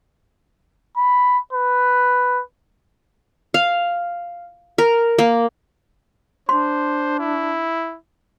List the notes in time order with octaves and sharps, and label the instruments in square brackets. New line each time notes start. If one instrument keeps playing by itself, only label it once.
[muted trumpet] B5
B4
[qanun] F5
A#4
A#3
[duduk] D4 [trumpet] C5 [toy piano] C6
[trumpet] E4